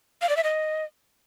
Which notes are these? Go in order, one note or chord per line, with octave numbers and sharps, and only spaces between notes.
F5
D5
E5
D#5